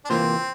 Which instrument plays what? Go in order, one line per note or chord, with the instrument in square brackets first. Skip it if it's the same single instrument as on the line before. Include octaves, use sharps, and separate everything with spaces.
[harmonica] D4
[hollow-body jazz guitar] C3 E3 A#3 F4 C5 [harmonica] C4